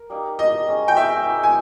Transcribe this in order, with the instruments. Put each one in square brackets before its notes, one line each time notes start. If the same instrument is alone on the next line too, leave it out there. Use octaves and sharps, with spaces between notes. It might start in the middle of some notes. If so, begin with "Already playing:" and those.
Already playing: [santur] A#4
G3 A#3 D#4
[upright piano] D#5
[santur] G#3 C#4 G#4
[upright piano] G5
E5
[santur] A#3 E4 G#4
[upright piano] G#5